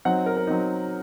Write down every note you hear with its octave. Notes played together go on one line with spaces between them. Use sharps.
F#3 C4 D#4 F#5
A#4
A#4
F#3 C4 D#4